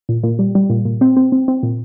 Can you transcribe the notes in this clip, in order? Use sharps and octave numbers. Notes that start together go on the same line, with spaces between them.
A#2
A#2
G3
G3
A#2
A#2
C4
C4
C4
C4
A#2